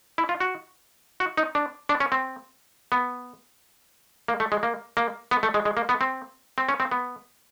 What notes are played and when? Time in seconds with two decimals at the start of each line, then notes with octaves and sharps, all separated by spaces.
0.18 E4
0.29 F4
0.40 F#4
1.20 F#4
1.37 D#4
1.55 D4
1.89 D4
2.00 C#4
2.12 C4
2.92 B3
4.28 A#3
4.40 A3
4.52 G#3
4.63 A#3
4.97 A#3
5.31 B3
5.43 A3
5.54 G#3
5.65 G#3
5.77 A#3
5.89 B3
6.01 C4
6.58 C4
6.69 C#4
6.80 C4
6.91 B3